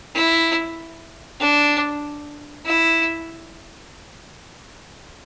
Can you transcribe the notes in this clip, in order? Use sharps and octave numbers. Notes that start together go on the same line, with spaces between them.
E4
D4
E4